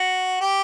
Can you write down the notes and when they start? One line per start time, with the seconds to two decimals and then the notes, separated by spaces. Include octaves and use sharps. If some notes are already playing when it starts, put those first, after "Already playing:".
Already playing: F#4
0.41 G4